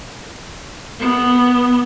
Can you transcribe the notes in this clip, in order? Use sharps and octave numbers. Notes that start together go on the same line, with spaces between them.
B3